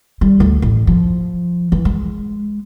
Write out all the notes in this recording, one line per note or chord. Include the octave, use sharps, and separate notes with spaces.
G3
D2
A1
F3
E3
G#3